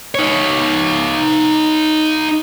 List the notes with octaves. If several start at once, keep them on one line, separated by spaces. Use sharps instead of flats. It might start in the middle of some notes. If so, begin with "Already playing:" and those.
D#4 C#5